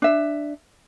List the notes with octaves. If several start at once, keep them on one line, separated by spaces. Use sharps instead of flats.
D4 E5